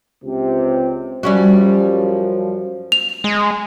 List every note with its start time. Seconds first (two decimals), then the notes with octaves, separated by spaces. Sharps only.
0.24 C#2 C3
1.23 F#2 F3 G3 C#4 F#4
2.92 F7
3.24 G#3